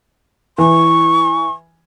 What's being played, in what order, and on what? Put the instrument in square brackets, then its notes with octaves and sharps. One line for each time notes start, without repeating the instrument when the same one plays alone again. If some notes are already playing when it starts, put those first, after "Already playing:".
[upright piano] E3 [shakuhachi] C#6